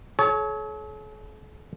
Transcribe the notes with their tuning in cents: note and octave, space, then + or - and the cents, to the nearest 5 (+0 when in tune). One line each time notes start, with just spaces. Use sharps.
A4 -45 C#5 +5